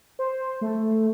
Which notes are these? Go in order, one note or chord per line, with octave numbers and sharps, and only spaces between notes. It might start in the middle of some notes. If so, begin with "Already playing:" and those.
C5
A3